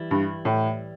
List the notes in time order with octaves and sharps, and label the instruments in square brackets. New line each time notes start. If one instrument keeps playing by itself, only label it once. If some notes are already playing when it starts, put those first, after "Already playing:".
Already playing: [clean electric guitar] E3 G3 E4
[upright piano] G2
A2